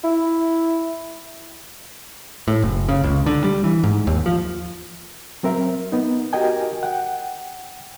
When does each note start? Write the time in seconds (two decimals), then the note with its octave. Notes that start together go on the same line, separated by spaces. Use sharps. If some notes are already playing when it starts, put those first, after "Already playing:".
0.04 E4
2.48 A2
2.62 F#1
2.89 C#3
3.04 C#2
3.26 D3
3.44 G3
3.64 E3
3.84 G#2
4.07 D#2
4.26 F3
5.43 F#3 C4 A#4 E5
5.92 B3 D#4
6.33 F#4 G4 A#4 D#5 G5 G#5
6.83 F#5 G5